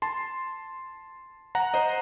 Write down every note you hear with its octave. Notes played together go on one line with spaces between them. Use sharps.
A5 C6
F#5 A#5
C5 D#5